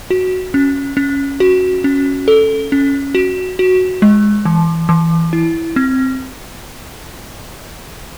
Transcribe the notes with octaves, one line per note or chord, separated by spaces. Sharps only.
F#4
C#4
C#4
F#4
C#4
A4
C#4
F#4
F#4
G#3
E3
E3
E4
C4